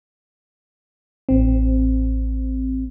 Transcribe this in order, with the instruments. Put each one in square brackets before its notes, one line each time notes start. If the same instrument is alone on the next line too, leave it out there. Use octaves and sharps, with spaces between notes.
[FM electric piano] A1 C4